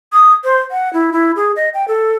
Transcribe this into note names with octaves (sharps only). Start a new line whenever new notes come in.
D#6
C5
F#5
E4
E4
G#4
D#5
G5
A4